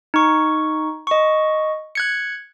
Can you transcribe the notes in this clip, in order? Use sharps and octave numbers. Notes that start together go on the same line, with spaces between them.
D#4 C#6
D#5 C#6
F#6 G#6 C#7